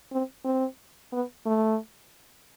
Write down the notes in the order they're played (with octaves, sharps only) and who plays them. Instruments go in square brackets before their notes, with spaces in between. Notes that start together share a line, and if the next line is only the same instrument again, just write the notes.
[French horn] C4
C4
B3
A3